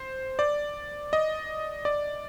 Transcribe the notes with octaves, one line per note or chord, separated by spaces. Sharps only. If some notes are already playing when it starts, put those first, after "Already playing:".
Already playing: C5
D5
D#5
D5